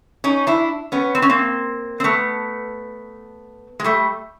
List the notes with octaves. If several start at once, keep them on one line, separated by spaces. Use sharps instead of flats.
C#4 D#4
D4 E4
B3 C#4
C4
C#4
A#3 C4
C4
A3 B3
G#3
G3 A3